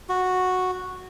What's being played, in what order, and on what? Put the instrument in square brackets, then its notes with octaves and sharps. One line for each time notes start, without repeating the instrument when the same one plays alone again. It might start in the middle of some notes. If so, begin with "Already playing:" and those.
[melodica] F#4